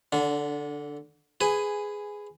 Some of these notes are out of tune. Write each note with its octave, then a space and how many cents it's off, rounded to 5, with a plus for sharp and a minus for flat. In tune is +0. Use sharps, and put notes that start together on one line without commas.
D3 +0 D4 -30
G#4 +0 B4 +20 G#5 -5